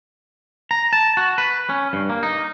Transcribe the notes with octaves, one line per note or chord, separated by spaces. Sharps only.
A#5
A5
F#4
B4
C#4
G2
A#3
D#4